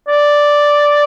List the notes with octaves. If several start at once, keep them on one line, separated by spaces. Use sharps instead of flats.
D5